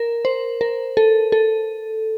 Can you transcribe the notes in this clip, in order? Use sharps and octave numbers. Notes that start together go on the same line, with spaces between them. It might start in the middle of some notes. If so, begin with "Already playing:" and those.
Already playing: A#4
C5
A#4
A4
A4